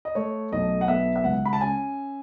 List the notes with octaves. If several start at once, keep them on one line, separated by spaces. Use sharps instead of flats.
D#5
A3 C#5
B1 D#5
F#5
B3 E5
E5
C#2 F#5
B5
A5
C#4 G#5